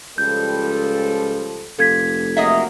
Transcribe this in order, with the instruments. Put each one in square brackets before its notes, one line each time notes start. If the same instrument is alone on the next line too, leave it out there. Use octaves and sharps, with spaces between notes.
[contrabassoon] C#2 [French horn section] F3 G3 A4 [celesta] G6
[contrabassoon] F1 [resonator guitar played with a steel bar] A#2 [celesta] A4 G#6 B6
[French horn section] F#3 A#3 [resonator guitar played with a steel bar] G#4 D#5 E5